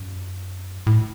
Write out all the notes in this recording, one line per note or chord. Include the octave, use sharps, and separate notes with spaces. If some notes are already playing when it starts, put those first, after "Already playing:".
Already playing: F#2
A2